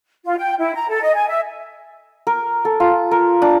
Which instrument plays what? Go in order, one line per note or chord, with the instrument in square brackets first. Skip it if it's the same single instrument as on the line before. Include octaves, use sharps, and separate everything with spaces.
[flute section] F4
G5
E4
A#5
A4
D#5
G#5
E5
[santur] A#4
A4
F4
A#4
D4